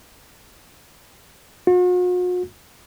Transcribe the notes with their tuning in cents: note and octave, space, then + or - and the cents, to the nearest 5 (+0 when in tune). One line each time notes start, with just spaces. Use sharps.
F#4 -45